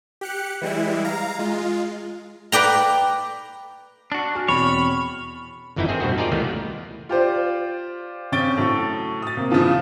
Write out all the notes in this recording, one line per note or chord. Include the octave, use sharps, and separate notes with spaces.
G4 F#6 C#7
E3 G3 G#3 E4
F5 A#5
G#3 F4
B4 D5 G5 A#5
D4 F#4
F#4 G#5 F6
E2 B2 C4 C#5 B5
G1 F2 E3 D#4 E4 G5
D#3 C4 G#4
G2 B2 A3 C4 F#4
D#4 F4 G#4 A#4 D5
C#2 D#3 E3 G3 A3 B3
F4 G4 C5 D5
C#3 C4 C#4 A6 D7 G7
A2 F#3 C#6
D#6 A6
C3 A#3
C#3 E3 F3 F4